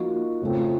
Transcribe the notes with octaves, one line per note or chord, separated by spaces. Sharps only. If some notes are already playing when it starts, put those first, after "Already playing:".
Already playing: F3 A#3 D#4 F#4
F2 C#3 F3 A3 C4